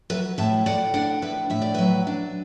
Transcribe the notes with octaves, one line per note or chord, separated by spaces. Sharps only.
F#3 B4 E5
A2 E5 A5
A2 D5 F#5
D4 D5 F#5
A2 B4 E5
A2 E5
D5
F#3 B4 E5
D4